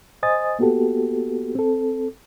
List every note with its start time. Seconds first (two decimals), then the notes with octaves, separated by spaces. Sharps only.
0.23 C5 D#5 G#5 D#6 A6
0.59 A#3 B3 F#4 G4 A4
1.55 C4 A4